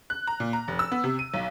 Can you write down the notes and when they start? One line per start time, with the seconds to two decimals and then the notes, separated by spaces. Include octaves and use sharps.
0.10 F#6
0.27 A#5
0.40 A#2
0.53 A#5
0.68 F1
0.79 E6
0.92 B3
1.04 C3
1.19 D#7
1.34 B1